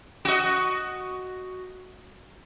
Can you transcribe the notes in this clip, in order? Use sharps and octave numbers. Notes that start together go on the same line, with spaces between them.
F#4 D#5